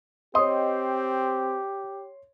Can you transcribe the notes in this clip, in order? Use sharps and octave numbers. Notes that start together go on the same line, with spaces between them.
C4 G4 C#5 D#5 C6